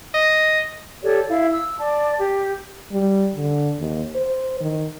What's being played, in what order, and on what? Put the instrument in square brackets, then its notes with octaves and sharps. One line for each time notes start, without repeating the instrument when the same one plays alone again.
[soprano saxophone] D#5
[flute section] G4 A4 C#5 D5
E4 F5
E6
D5 A5
G4
[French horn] G3
D3
D#2
C5
D#3